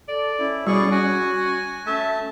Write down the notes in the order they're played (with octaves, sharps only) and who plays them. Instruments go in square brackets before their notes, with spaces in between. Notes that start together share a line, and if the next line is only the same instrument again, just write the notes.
[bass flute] A4 [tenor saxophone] D5
[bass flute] C#4 [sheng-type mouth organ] E4
[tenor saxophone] B2 [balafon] G3 [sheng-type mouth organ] G#4 D5 C#6
[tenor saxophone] F#4 [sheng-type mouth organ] G#5
[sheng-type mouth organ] A3 A5 [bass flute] C#4 [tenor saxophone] E5